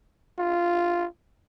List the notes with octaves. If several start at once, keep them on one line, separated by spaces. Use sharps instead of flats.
F4